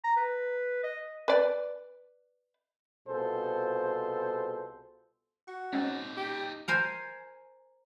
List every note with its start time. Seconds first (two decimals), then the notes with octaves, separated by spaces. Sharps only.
0.04 A#5
0.17 B4
0.83 D#5
1.28 B4 D5
3.08 C2 B2 F4 G#4 A4 C5
5.48 F#4 C#6
5.73 G#3 C4 C#4 D#4 D5
6.17 G4
6.68 A#4 C5 G#5